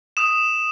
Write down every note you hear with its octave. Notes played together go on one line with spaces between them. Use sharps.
D#6 E7